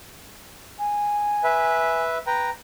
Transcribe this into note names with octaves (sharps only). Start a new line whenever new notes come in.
G#5
B4 E5
B4 G5 A#5